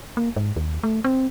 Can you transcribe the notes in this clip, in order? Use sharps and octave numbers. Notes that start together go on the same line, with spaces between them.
A#3
G#2
D#2
A3
C4